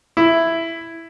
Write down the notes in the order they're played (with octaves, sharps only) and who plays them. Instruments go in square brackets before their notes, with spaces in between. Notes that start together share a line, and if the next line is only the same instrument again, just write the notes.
[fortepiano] E4